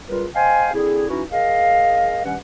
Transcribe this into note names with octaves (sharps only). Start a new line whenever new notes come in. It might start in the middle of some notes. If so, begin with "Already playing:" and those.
C#2 G3 F4 A#4 B4
C5 D#5 F5 G5 G#5
D3 C4 E4 G#4
E3 C#4 D#4 E4 F#4
G#4 A#4 D#5 F5
G2 D#3 G3 C#4 B4 F#5